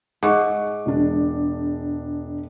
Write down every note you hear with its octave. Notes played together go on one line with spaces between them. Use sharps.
G#2 C#6 D6
E1 D4